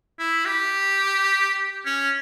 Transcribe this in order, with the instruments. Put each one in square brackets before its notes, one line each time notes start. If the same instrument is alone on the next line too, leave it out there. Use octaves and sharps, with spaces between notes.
[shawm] E4
G4
C#4